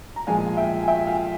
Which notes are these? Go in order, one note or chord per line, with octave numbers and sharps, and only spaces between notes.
A#5
A#2 F3 G#3 F5 G#5
E5 G5
G#5
E5 G5
F5 G#5